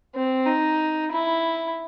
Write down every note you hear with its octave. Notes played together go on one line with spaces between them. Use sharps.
C4
D#4
E4